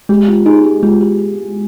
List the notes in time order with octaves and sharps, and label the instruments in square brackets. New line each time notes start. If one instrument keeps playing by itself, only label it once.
[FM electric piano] G#3 [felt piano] G4
[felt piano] F4
[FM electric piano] D#4 [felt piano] G#4
[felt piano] G4
[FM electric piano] G#3 [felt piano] F4
[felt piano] G4